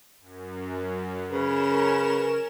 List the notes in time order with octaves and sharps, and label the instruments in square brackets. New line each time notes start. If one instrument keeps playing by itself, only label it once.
[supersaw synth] F#2
[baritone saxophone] C#3 [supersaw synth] C#4 A#4 E7 [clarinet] B4